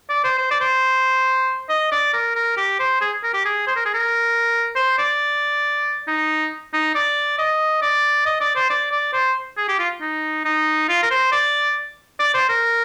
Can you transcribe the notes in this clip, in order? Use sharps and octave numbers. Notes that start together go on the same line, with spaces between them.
D5
C5
C5
D5
C5
D#5
D5
A#4
A#4
G4
C5
G#4
A#4
G4
G#4
C5
A#4
G#4
A#4
C5
D5
D#4
D#4
D5
D#5
D5
D#5
D5
C5
D5
D5
C5
G#4
G4
F4
D#4
D#4
F4
A#4
C5
D5
D5
C5
A#4